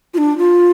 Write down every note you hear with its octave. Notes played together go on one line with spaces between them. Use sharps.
F4
D4
F4